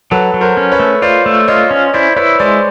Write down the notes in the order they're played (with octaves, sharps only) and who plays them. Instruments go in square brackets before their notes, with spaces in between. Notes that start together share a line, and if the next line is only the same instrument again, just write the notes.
[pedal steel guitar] F#3 [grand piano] A4 B4
[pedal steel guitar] F#3
[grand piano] A#4 C5
[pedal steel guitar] C#4
[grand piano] B4 C#5
[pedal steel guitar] A3
[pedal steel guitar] F4 [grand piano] C5 D5
[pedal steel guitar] A3
[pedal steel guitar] F4 [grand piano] C#5 D#5
[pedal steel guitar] C#4
[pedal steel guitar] E4 [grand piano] C5 D5
[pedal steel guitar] E4 [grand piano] B4 C#5
[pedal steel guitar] G#3 [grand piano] C5 D5